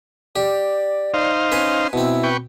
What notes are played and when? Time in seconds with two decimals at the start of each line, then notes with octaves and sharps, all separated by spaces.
0.36 G4 D5
1.14 D#4 C5 F5
1.52 C#4 B4 G#5
1.93 B2 C4 E4
2.23 B4 G5 C#6